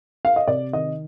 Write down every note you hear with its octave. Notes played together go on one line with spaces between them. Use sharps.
F5
D#5
C3 D5
D#3 D#5